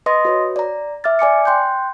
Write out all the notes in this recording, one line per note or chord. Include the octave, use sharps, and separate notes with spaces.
B4 D#5 C6 D#6 A#6
F#4 B4 C#5
D5 A#5
E5 D6 F6 A6
D5 G#5 D6 C#7
G5 C6 F#6 G6